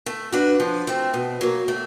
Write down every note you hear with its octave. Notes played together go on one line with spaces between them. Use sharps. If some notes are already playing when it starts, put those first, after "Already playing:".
A3
D4 F#4 B4
F3
A3 C4
B2
F#3 A#3
A3